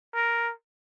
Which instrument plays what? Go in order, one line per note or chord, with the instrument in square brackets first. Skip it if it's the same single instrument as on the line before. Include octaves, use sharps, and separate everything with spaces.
[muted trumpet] A#4